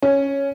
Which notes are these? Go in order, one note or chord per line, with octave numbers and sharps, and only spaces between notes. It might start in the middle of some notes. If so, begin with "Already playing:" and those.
C#4